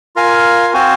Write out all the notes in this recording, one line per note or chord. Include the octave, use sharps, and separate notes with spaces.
F4 A#4 F5 G#5
C4 F#4 C5 F5 G#5